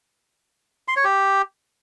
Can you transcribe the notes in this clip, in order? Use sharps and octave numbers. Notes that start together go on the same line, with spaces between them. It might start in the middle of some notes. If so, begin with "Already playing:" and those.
C6
C#5
G4